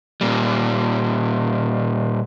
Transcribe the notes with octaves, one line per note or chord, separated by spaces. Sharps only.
A#2 G3